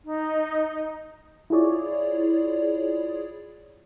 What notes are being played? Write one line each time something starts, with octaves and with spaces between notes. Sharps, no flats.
D#4
E4 F4 G#4 C#5 D5